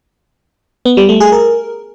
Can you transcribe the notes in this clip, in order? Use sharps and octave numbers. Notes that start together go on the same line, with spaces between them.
B3
G3
A3
G#4
A#4